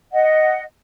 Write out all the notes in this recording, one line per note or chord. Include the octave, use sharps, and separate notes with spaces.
D#5 F#5